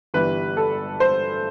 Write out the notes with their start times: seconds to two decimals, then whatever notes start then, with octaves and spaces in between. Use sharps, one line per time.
0.14 G1 G2 E3 G3 B4
0.57 A4
1.00 C5